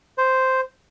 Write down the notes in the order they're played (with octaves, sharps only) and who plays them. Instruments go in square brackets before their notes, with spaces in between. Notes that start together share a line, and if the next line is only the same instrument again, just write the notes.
[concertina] C5